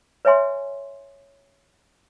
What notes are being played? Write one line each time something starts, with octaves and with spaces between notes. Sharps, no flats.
B4 C#5 E5 G#5 C6